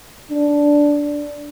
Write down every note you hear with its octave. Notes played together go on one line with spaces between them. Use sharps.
D4